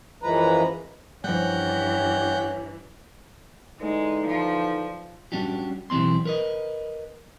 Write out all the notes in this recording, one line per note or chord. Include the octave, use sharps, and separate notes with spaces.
F#2 E3 F3 G#3 B4 A#5
G2 E3 F3 G3 C#4 F#5 G5
D3 E3 G#3 D#4
F3
G3 C#4 D4 F#4 G4
B1 E3 G3 C4 C6
A#4 B4 D#5